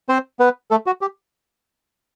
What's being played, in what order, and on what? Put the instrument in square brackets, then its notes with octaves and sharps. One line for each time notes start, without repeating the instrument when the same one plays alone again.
[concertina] C4 C5
B3 B4
A3 A4
F#4
G4